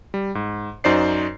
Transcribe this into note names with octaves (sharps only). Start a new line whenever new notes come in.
G3
G#2
F#2 D#4 F#4 C5 D5 C7